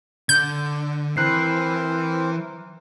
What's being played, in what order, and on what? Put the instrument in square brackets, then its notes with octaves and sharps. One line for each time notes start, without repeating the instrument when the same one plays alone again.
[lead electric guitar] D3 [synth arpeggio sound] G6
[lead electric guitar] E3 [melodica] C4 A#4 C5 [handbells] F#6 C7